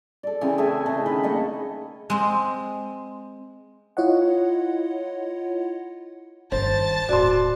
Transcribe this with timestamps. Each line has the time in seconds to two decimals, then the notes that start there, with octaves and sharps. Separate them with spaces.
0.23 A4 D5
0.41 C#3 E3 C4
0.58 A3 G#4 E5 G#5
0.86 C#3 A3 D#5
1.06 D#3 B4
1.23 A#3 A4 D#5 C#6
2.10 G#3 C4
3.97 E4 F4 C#5 D#5 F#5
6.52 G1 D#3 C5 A5 A6
7.09 D#1 A2 F#4 D5 C6